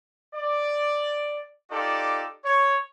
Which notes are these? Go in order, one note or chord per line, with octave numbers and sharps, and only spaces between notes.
D5
D#4 F4 G4 A4 D5
C#5